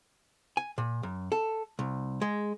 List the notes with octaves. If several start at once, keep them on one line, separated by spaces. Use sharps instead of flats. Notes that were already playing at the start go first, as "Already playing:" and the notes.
G#5
A#2
F#2
A4
C2
G#3